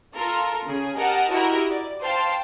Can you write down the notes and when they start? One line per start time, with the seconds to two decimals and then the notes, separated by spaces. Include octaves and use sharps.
0.15 F4 A4 A#4
0.66 C#3 G#4
0.96 G4 A#4 D#5 F#5 G#5 A5
1.31 E4 F#4 G4 A#4 D#5
1.71 D5
2.02 C5 F5 G5 A5